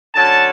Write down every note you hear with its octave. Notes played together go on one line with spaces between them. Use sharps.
D3 F#3 C#4 A5